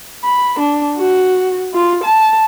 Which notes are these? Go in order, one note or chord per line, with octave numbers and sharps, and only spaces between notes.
B5
D4
F#4
F4
A5